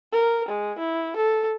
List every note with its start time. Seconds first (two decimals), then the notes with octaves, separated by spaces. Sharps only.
0.13 A#4
0.48 G#3
0.78 E4
1.16 A4